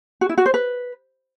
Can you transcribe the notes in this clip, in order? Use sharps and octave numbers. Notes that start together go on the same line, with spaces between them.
F#4
E4
F#4
C5
B4